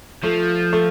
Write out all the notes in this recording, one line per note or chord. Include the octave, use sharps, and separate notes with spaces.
F3 A3
A3